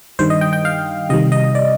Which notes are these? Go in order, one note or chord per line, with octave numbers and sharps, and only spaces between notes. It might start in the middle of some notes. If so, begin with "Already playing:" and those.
G2 D#3 G3 C5
D#5
G5
G5
F5
C3 D#3 G3 D#5
D#5
D5